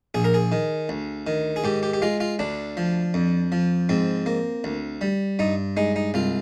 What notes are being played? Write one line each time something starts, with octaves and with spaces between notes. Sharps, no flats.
A#1 G#4
A#4
G#4
D#3
D2
D#3
G#4
G#2 G4
G4
G4
G#3 F4
F4
D2 D4
F3
F2
F3
G#2 C4
A#3
D2
G3
G2 D#4
G#3 D#4
D#4
C2 F4